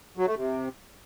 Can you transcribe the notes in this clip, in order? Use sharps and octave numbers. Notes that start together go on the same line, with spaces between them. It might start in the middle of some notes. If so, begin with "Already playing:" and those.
F#3
A3
C3